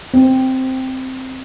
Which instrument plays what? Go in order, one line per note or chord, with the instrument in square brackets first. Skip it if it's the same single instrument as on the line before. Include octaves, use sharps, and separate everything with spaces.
[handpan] C4